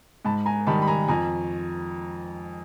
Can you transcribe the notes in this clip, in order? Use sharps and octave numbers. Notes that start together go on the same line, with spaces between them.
G#2 A5 B5
G#5 A#5
D#3 G3 A5 B5
B5
G#5 A#5
F2 G#5 A#5